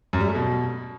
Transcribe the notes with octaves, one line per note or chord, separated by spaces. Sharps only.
F#2
G3
A3
B2